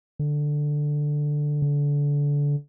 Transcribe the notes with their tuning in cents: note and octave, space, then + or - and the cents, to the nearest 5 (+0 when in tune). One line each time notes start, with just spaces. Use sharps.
D3 +5
D3 -25